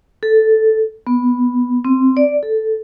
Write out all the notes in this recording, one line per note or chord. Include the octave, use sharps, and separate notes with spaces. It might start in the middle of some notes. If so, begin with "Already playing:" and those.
A4
B3
C4
D5
A4